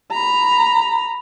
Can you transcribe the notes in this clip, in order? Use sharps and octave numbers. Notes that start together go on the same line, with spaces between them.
A#5 B5